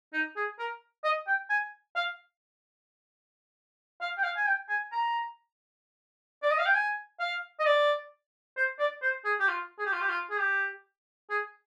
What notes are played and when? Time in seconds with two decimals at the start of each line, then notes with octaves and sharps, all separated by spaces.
0.13 D#4
0.36 G#4
0.59 A#4
1.04 D#5
1.27 G5
1.50 G#5
1.96 F5
4.01 F5
4.18 G5
4.23 F5
4.37 G#5
4.46 G5
4.69 G#5
4.92 A#5
6.42 D5
6.50 D#5
6.58 F5
6.66 G5
6.74 G#5
7.20 F5
7.59 D#5
7.66 D5
8.57 C5
8.79 D5
9.02 C5
9.25 G#4
9.40 G4
9.48 F4
9.78 G#4
9.86 G4
9.93 F4
10.01 G4
10.09 F4
10.30 G#4
10.40 G4
11.30 G#4